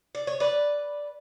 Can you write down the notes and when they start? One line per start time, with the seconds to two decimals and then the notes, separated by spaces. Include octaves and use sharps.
0.15 D5
0.27 C#5
0.40 B4 D5